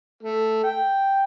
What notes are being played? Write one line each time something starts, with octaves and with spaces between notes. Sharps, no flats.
A3
G5